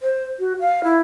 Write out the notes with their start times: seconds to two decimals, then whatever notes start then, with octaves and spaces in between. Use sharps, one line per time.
0.01 C5
0.39 F#4
0.60 F5
0.84 E4